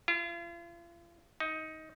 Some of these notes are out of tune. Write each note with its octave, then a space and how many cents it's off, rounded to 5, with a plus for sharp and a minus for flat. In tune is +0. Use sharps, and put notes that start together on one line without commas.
F4 -40
D#4 +15